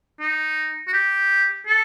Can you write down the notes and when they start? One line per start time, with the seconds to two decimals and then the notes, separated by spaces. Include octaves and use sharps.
0.20 D#4
0.88 F#4
0.93 G4
1.66 A4